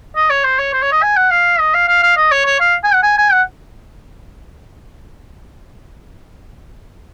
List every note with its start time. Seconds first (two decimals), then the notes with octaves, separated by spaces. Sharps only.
0.16 D#5
0.30 C#5
0.44 C5
0.59 C#5
0.73 C5
0.82 C#5
0.92 D#5
1.02 G#5
1.16 F#5
1.31 F5
1.60 D#5
1.74 F5
1.88 F5
2.03 F5
2.17 D#5
2.31 C#5
2.46 C#5
2.60 F5
2.84 G#5
2.94 F#5
3.03 G#5
3.18 G#5
3.32 F#5